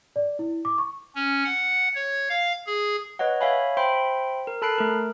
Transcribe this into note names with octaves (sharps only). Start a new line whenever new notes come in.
D5
E4
D6
C#6
C#4
F#5
C#5
F5
G#4
B4 C#5 D#5 F#5
C#5 E5 F5 G#5 B5
C5 E5 G5 B5 C6
A#4
A4 A5 B5 F#6 C7 D7
A3 A#4